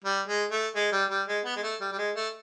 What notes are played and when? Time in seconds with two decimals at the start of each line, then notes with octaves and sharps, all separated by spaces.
0.04 G3
0.28 G#3
0.51 A3
0.75 G#3
0.92 G3
1.10 G3
1.28 G#3
1.45 B3
1.56 G#3
1.63 A3
1.81 G3
1.92 G3
1.98 G#3
2.16 A3